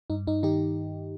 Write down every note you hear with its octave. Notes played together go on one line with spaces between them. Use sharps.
G2 D#4
G2 D#4
D#3 D#4 G4